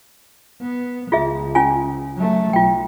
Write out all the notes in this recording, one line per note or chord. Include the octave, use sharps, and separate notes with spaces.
B3
C#2 F4 G#4 E5
C#4 F4 G#5
F#3 A3
B1 F4 G5